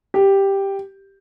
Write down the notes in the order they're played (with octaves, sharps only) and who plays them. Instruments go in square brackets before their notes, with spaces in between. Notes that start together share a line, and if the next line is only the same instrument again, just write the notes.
[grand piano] G4